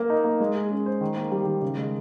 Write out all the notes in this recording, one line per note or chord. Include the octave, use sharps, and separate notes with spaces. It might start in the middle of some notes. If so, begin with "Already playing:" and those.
Already playing: A#3 A#4
D#4
A#3
G#3
G#4
C#4
C5
D#3
A#3
G3
D#3
C#3
G#3